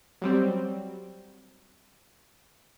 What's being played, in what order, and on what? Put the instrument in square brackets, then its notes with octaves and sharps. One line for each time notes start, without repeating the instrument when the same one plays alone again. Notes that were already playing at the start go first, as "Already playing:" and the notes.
[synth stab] F#3 G3 C4